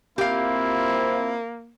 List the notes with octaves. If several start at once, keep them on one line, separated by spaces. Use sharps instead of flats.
A#3 C4 E4 F4 G4 F5